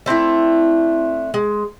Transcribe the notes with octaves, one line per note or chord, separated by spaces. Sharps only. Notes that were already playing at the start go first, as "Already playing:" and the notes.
A3 C4 D4 E4
G#3